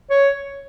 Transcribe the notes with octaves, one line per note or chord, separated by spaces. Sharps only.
C#5